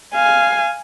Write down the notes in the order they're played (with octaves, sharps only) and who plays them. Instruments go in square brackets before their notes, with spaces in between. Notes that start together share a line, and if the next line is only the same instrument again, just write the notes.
[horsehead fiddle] F5 [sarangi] G#5